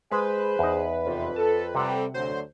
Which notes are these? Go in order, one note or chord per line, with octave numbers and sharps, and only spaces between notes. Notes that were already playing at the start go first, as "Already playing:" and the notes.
G#3 G#4 B4 C5
E2 D#4
F2 C3 C5
A4 A5
C3 G3 C4 A4 F#5
D2 F#3 C5